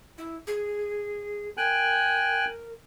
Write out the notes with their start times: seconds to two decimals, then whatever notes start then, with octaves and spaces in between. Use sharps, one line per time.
0.18 E4
0.47 G#4
1.57 A#4 G5 G#5 F#6